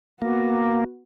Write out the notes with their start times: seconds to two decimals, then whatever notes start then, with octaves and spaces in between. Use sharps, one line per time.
0.22 A#3 B3 F#4